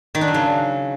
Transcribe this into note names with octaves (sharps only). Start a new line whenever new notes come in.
D#3
D4
F#3
C#3